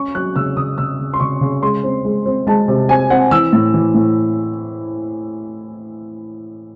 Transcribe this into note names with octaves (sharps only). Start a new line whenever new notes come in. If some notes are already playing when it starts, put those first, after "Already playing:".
Already playing: C#4 C#6
F#3 F#6
C#3 E6
C#3 D#6
C#3 E6
C#3
C6
C#3 C#6
C#3
G#3 C6
C4
G#3
C4
G#3 A5
C3
C4 G#5
C4 F#5
E3 E6
A2
E3
A2